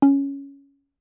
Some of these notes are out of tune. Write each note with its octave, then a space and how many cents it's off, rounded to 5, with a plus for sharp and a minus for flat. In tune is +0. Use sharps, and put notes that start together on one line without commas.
C#4 +5